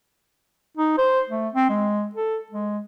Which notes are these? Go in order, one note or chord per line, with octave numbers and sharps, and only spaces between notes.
D#4
C5
A3
C4
G#3
A4
G#3